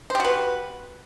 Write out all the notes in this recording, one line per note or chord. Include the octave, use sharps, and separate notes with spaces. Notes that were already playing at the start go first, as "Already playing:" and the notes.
F#4 G4 B4 C5